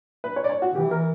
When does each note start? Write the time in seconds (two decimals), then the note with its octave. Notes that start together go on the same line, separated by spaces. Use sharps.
0.24 B4
0.36 C#5
0.44 D5
0.49 C#5
0.62 F#4
0.74 E3 G4
0.91 A#4